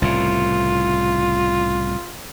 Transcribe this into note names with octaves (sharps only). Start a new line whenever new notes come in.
C2 A2 C#3 F4